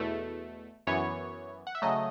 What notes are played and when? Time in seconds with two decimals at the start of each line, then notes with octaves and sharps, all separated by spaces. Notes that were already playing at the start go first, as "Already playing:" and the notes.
Already playing: E2 B2 A3
0.87 F#2 E3 B3 C#5
1.67 F#5
1.75 E5
1.82 C#3 F#3 A3 D#5